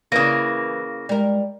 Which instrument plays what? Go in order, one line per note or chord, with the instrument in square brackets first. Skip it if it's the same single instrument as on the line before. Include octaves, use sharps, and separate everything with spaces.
[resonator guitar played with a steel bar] C#3 A#3 [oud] E3 [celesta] A#6
[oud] G3 A#4 [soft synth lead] G#3